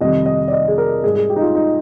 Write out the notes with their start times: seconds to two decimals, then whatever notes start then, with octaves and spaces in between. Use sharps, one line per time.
0.01 F2 C3 D#3 G3 D#5
0.26 D#5
0.48 D5
0.52 D#5
0.68 G#4
0.78 A#4
1.03 G#2 G3 G#4
1.16 G#4
1.30 G4
1.36 D#4
1.42 F4
1.55 D#4